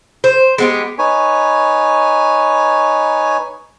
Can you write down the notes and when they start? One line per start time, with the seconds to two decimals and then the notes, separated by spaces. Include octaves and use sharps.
0.24 C5
0.58 G#3 B3 G4
0.99 D#4 B4 C#5 G#5